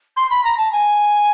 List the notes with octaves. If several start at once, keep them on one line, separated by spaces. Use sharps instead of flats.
C6
B5
A#5
A5
G#5